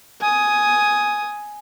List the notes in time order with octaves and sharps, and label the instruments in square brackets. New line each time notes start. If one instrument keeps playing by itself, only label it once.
[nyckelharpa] G#5 D#6